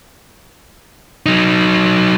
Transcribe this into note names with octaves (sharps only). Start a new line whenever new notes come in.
F#3 D#4